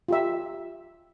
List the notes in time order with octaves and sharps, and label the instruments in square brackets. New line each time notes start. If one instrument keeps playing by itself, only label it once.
[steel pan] F4 G4 E5